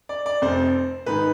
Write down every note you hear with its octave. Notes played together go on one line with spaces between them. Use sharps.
D5
D5
F1 F2 C3 C5
G#1 G#2 D#3 B4